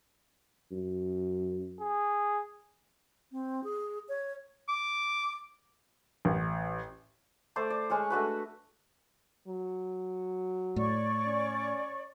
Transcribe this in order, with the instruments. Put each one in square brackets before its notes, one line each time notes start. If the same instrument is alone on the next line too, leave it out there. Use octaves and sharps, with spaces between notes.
[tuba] F#2
[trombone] G#4
[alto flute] C4
G#4
C#5
[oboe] D6
[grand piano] A1
[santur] A3 C5 D5 C6
D5
G#3 C#4 C#5 C#6
A3 D4 F#4 B4
[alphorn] F#3
[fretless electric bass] A2 [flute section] C#5 D5 C#6
[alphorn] C#4